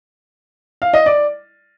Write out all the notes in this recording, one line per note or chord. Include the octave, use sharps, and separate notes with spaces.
F5
D#5
D5